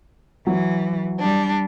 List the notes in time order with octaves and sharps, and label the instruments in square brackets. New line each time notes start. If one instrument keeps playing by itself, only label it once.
[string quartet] E3 [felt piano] F#3 F#4
[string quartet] G3 D4